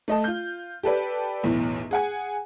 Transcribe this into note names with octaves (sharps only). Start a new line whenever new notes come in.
A3 D#5 A5
F4 G6
G4 A4 B4 D5
B1 E2 A2
G#4 F#5 G#5